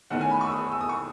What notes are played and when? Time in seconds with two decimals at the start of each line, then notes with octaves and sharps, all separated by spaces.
0.10 E2 D#3 A3 C#4 F#5
0.21 G#5
0.31 B5
0.41 C#6
0.46 E6
0.52 D#6
0.72 E6
0.81 D#6
0.89 C#6